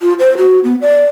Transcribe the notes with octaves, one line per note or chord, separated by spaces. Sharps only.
F4
C5
F#4
B3
D5